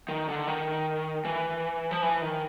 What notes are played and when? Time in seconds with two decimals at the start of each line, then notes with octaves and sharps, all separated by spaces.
0.09 D#3
0.28 D3
0.47 D#3
1.25 E3
1.91 F3
2.02 E3
2.21 D#3